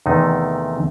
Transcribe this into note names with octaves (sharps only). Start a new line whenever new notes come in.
E2 C3 D#3 A3 D#4